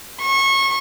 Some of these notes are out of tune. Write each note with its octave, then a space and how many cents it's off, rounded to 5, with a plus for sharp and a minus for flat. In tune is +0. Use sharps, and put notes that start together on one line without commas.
C#6 -30